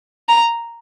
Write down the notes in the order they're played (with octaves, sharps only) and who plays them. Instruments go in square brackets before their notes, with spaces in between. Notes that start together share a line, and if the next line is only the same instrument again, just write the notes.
[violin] A#5